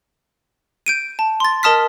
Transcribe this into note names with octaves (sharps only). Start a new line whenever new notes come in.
G6 D7 D#7
A5
C6 A6
A#4 D#5 A5 D#6 F6 B6